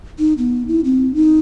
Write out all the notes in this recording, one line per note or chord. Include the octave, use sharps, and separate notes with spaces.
D#4
B3
E4
C4
D#4